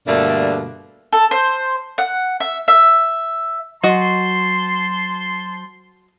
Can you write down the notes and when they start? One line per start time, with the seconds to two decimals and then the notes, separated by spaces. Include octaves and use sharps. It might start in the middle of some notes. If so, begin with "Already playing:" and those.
0.07 G2 B2 D3 A3 A#3 D4
1.13 A4
1.31 C5
1.98 F#5
2.40 E5
2.68 E5
3.84 F#3 F#4 C5 D#5 A5 C6